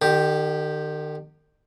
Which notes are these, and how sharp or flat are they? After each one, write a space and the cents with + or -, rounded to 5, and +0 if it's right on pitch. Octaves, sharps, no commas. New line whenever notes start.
D#3 -45 G4 +0